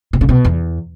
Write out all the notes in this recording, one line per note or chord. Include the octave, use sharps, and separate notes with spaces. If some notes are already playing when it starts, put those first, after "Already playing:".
B2
C#3
B2
E2